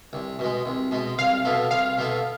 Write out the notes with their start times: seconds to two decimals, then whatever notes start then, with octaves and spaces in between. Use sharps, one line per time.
0.13 C2
0.39 B2 G#3
0.65 C2
0.91 B2 G#3
1.18 C2 F5
1.45 B2 B3 E4 A4
1.71 C2 F5
1.98 B2 B3 E4 A4